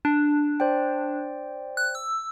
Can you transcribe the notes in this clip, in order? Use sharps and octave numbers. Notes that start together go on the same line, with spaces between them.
D4
C5 D5 G5
F#6
E6